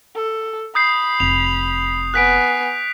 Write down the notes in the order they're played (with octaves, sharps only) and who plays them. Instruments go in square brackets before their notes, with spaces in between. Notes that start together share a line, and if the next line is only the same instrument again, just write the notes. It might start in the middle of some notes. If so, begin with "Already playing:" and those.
[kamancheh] A4
[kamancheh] B5 [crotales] D#6 G6 C7
[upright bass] F1 [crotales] F7
[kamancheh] B3 G#5 [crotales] F#6 B6 D7